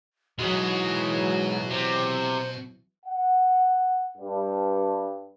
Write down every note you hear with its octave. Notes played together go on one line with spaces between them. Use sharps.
G#2 B2 E3 F#3 G#3 F#4
C3 C5
F#5
G2